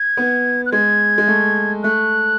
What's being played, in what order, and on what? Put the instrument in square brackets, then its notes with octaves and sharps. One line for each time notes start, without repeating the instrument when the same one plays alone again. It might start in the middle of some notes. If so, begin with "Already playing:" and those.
Already playing: [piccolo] G#6
[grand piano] B3
[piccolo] F#6
[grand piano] G#3 [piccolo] G#6
[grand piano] G#3
A3
[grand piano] A3 [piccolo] F#6